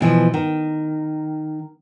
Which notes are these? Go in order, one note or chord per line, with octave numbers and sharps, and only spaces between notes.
B2 E3 F3
D#3